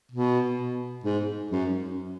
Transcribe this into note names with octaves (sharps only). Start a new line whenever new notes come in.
B2
G#2
F#2